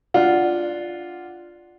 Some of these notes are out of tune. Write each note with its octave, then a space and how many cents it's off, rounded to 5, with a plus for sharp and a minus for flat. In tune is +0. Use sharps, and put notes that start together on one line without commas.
D4 +0 F4 +0 F#5 +0